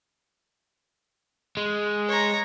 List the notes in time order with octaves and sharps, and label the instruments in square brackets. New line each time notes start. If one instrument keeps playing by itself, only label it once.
[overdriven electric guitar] G#3
[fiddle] C#5 A#5